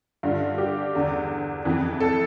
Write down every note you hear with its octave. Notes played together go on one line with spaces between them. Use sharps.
G2 D3 F4
G4
E2 D3
F2 E3
A4